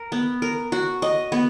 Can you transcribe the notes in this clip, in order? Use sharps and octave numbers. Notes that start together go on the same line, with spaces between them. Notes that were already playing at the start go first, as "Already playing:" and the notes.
Already playing: A#4
B3
A#4
F#4
D#5
B3